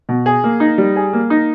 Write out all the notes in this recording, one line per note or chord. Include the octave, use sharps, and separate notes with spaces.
B2
G#4
A#3
D#4
G3
G#4
A#3
D#4